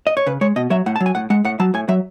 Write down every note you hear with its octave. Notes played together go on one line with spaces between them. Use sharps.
D#5
C#5
C#3 B4
G#3 C#5
B2 D#5
F#3 E5
A2 F#5
A5
F#3
G#5
A2 F#5
G#3 F#5
A2 F#5
F#3 A5
A2 G#5
F#3 E5